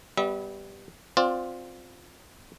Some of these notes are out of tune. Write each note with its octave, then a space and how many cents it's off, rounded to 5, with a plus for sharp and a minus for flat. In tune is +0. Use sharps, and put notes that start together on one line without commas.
G3 +0 B3 +0 E5 -40
C4 +0 F4 +20 D5 +0